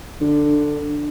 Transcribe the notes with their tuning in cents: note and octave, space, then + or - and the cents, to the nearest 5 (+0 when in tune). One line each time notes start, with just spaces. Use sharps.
D3 +10